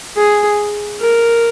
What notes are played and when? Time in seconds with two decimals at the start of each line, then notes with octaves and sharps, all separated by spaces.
0.17 G#4
1.01 A#4